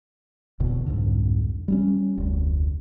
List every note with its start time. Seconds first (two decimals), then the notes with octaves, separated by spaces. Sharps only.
0.60 F1 E2 B2 D3
0.86 C2 F2 G#2 D3
1.68 G3 C4 C#4
2.18 F1 D2